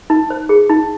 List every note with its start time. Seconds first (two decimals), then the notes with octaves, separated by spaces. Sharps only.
0.10 D#4
0.30 C5
0.49 G#4
0.69 D#4